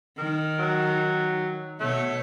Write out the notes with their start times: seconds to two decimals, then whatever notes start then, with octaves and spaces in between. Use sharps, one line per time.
0.18 D#3 A#4
0.59 F#3
1.80 B2 A3 C#5